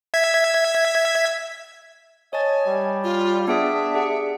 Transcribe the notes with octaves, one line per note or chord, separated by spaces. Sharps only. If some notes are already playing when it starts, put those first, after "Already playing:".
E5 G#6 B6
C#5 D#5 G#5 A5 A6
G3
F4
B3 D4 G#4 E5 D#6
G4 G#4 F#5